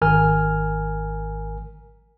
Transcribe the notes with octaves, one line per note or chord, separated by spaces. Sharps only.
G#1 A#4 G#5 F6